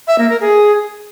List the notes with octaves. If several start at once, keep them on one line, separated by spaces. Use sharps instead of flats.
E5
A#3
A#4
G#4